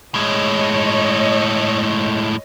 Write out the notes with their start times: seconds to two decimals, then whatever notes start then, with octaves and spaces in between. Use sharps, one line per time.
0.15 A2 G#3 C#5 D#5